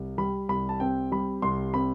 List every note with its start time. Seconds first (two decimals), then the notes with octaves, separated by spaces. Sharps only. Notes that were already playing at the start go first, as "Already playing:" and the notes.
Already playing: C2
0.18 G3 B5
0.49 C2 B5
0.69 A5
0.80 C4 G5
1.12 G3 B5
1.42 C2 C6
1.74 C4 B5